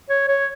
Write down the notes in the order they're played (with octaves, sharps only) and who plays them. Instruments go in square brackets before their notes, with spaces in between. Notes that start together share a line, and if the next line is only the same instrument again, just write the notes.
[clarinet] C#5
C#5